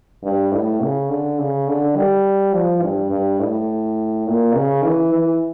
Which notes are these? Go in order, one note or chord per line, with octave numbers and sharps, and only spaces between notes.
G2
A2
C#3
D3
C#3
D3
G3
F3
G2
G2
A2
A#2
C#3
E3
E3